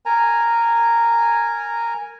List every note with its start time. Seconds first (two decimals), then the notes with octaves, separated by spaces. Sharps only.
0.06 A#4 G#5 A#5